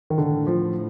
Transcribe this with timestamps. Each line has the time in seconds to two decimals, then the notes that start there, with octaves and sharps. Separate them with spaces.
0.10 D#3
0.17 A2 D3
0.47 F3